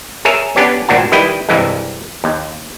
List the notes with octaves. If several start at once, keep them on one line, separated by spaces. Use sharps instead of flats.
G#4 A#4 C#5 E5
B3 C#4 D4 G4 C#5
G#1 A#2 D4 F#4 A5
D#3 G3 E4 B4 G5
C2 G2 E3 G#3
D#2